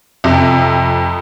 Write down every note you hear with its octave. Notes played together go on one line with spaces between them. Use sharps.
F2 C3